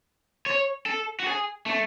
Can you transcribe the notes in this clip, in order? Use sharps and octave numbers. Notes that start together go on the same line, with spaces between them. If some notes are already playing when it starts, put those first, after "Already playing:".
C#5
A4
F#4
G#4
A3